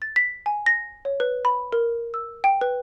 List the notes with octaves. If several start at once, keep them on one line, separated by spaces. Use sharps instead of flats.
A6
B6
G#5
A#6
C#5
B4
B5
A#4
E6
G5
B4